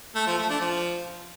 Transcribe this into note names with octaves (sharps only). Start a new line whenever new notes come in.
A3
F3
A3
D4
F3